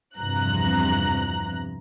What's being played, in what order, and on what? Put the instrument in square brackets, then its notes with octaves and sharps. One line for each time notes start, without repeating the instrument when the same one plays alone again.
[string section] E2 G2 C3 F3 A#5 F#6